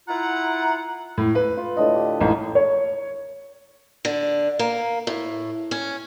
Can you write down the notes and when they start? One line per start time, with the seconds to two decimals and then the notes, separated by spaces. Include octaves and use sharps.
0.08 E4 F4 F#5 A#5
1.18 A2
1.35 B4
1.57 F4
1.77 A2 D3 D#5
1.94 G4
2.21 A1 D#4
2.55 C#5
4.05 D3
4.59 A#3
5.07 A2
5.71 C#4